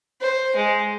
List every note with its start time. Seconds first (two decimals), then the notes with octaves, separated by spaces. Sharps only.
0.21 C5
0.56 G#3